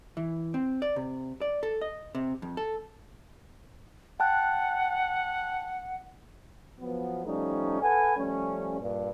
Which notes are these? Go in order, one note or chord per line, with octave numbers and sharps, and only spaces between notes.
E3
C4
D5
C3
D5
A4
D#5
C3
F2
A4
F#5 G5 A5 F#6
F3 F#3 B3
F3 G3 A3 C#4 D#4
A4 B4 F#5 G#5
F3 G3 A3 C#4
G2 A#2